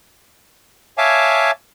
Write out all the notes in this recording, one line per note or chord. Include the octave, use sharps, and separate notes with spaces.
C#5 E5 F5 G#5 A5 D6